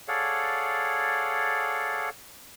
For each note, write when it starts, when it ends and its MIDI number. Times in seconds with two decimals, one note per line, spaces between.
0.08 2.09 68
0.08 2.09 69
0.08 2.09 73
0.08 2.09 74
0.08 2.09 77
0.08 2.09 78